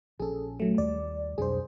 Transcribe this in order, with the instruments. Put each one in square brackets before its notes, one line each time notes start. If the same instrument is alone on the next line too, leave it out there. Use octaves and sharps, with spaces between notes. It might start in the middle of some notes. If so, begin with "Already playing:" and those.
[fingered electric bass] A#1 C#4 [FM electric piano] G#4 A4
[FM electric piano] F#3 A3
[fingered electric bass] D#2 G3 [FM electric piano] D5
[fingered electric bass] B1 F2 D4 [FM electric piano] G#4 C5